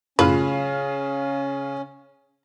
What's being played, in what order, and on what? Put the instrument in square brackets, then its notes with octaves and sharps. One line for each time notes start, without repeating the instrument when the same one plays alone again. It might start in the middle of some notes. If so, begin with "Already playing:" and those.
[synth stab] F#2 A2 F4 [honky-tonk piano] C#3 F5 [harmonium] C#4 [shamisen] B4